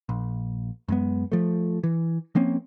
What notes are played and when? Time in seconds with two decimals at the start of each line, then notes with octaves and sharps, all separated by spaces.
0.09 A#1
0.88 F#2 G#3 B3
1.32 F3 A3
1.83 E3
2.35 F3 A#3 C4 C#4